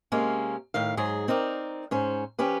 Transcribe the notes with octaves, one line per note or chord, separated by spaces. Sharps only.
C3 G#3 A#3 C#4
A2 D#3 F5
G#2 F#3 G#4
C4 D#4 A#4 D5
G#2 C#4 C5
F3 C#4 G4 B4